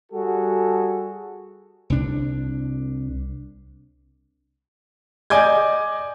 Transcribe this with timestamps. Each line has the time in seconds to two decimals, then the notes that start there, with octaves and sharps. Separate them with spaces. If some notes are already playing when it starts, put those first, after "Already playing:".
0.11 G3 F#4 G#4 A4
1.90 C2 D4
5.30 D5 D#5 G#5 D6 G6 G#6